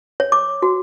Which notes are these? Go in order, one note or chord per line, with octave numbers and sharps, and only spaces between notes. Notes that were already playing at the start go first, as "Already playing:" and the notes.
C#5
D6
F#4